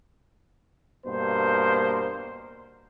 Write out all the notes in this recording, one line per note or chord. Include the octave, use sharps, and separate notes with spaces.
G2 B2 A#3 C5